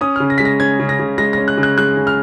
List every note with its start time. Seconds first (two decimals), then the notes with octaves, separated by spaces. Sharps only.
0.01 C#4 D#6
0.16 C#3 F6
0.30 A#6
0.38 G#3 B6
0.45 A#6
0.60 C#4 G#6
0.79 C#3
0.89 A#6
0.99 C#3
1.18 G#3 A#6
1.33 C#4 A#6
1.48 F#6
1.58 C#3
1.63 F#6
1.78 G#3 F#6
1.97 C#3
2.07 F6